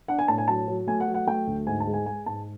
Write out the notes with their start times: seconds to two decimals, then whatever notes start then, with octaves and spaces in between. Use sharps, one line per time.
0.08 D4 F#5
0.19 G#5
0.28 A2 A5
0.38 G#5
0.48 F#3 A5
0.68 F#3
0.87 A3 G#5
1.00 F#5
1.08 F#3
1.14 F#5
1.27 A3 G5
1.47 D2
1.67 G#2 G#5
1.80 A5
1.87 G#3
1.93 G#5
2.06 G#3 G#5
2.26 G#2 A5